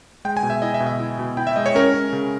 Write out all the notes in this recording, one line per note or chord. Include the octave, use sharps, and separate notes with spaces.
G#3 G5
G#5
B2
E5
E4 D#5
E5
B2
E5
E4
B2
E4 G5
E5
G#3 D#5
C#5
C#4 A#4
C#4
C#3